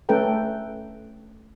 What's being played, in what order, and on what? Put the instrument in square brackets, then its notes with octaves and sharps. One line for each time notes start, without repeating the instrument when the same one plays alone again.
[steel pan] A3 C#4 A4 B4 G5 A#5